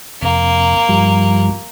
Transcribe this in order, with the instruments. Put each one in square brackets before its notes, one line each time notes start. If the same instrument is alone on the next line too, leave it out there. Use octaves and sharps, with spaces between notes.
[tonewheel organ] F2 C3 [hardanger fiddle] A#3
[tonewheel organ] G2 F3 G3